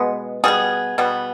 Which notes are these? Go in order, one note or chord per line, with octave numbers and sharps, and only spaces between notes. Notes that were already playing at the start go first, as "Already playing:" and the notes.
Already playing: B2 G#3 B3
B2 G3 B3 G#4
B2 G3 B3